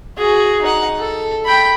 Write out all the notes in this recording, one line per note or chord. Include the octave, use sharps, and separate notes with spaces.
F#4 G#4
D#4 F#5
A4
G5 B5